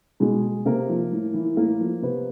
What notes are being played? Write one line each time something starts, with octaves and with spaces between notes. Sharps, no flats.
B2 G#3 G#4
C3 A#3 A#4
F3
A2
E3
A2 A#3 A#4
F3
C3 B3 B4